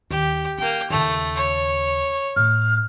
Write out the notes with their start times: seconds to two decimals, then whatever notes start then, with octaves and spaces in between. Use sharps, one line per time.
0.11 D#2 G4
0.58 A#3 E4 G5
0.90 D#2 C#3 A3
1.36 C#5
2.36 A2 F6